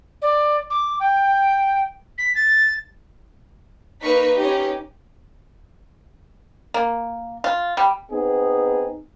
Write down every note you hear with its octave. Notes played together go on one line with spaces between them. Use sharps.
D5
D6
G5
B6
A6
A#3 D#4 A#4 B4 C#6 B6
C#4 D#4 G4
A#3
F4
G3
B3 C4 D#4 G#4